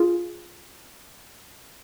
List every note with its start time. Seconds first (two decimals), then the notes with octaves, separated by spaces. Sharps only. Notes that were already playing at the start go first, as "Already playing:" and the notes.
Already playing: F4 G#4